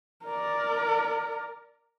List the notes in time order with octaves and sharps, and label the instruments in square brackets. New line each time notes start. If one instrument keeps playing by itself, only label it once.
[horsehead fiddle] A#4 D5